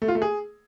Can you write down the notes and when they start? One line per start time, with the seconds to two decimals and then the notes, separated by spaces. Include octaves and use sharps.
0.02 A3
0.08 F4
0.15 A3
0.22 G#4